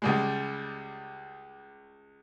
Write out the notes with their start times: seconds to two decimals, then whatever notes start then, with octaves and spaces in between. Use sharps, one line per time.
0.02 C#2 G3 G#3